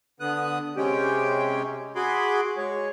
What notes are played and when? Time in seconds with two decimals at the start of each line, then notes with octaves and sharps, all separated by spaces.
0.20 D3 B3 D#6 F#6
0.77 C3 G#3 C#4 G4 G5
1.96 F#4 G#4 B5 C6 D6
2.57 G#3 C#5